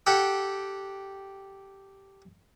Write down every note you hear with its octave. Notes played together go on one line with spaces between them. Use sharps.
G4 A4 F#5 G5